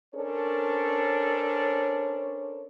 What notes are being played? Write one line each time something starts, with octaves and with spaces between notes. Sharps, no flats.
C#4 D4 A4 A#4 C5 C#5